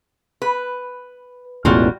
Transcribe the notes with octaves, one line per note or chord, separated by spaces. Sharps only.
B4
E1 A1 E2 G3 F4 F#4